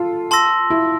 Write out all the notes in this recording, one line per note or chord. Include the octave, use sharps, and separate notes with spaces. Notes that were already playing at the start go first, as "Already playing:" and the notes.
Already playing: F4 A4
A5 C6 E6 A#6
E4